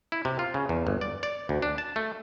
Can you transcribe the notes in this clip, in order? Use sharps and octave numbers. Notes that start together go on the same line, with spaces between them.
E4
C3
F4
C#3
E2
G1
D5
D5
D2
D4
A5
A3